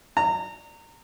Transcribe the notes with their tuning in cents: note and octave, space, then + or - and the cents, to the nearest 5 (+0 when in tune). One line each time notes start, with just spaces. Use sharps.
A#5 -25